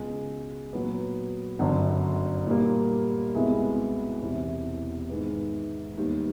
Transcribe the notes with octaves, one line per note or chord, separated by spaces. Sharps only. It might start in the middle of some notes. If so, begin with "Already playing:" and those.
Already playing: C#2 B2 G#3
A#2 F#3 B3
G1 F#2 D3
A#2 G3 A#3
C2 B2 G#3 B3 E4
E1 E2 C3 E3
G#2 D#3 G#3 B3
D#2 D#3 G3 B3